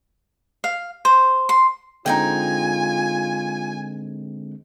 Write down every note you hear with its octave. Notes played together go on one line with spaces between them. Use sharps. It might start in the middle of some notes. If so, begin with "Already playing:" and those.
F5
C5
C6
D3 G#3 C4 D#4 F4 F#4 G5 G#5